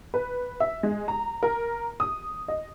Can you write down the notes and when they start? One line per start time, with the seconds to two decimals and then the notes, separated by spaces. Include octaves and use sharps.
0.14 B4
0.60 E5
0.83 G#3
1.08 A#5
1.43 A#4
2.00 D#6
2.48 D#5